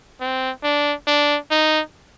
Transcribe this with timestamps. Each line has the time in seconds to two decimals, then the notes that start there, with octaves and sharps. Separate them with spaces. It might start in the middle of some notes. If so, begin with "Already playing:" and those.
0.21 C4
0.63 D4
1.07 D4
1.51 D#4